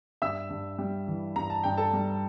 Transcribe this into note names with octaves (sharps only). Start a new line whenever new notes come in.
G2 E5 E6
G2
G3
E3
G2 A#5
A5
G2 G5
A4 A5
G3